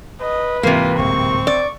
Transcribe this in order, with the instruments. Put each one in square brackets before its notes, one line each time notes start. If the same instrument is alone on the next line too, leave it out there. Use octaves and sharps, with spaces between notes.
[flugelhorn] B4 [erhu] D#5
[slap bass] G#2 E3 [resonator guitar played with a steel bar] C3 A#3 [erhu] F4
[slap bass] D1 G#2 [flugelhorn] C4 [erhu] C#6
[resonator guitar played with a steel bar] D5